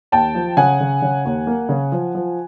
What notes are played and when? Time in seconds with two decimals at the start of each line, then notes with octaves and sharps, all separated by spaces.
0.12 D#2 G5 A5
0.35 F3
0.57 C#3 F#5 G#5
0.80 C#3
1.02 C#3
1.25 D#2
1.47 A#3
1.69 C#3
1.92 F3
2.15 F3